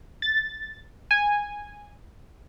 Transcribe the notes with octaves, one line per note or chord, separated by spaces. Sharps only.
A6
G#5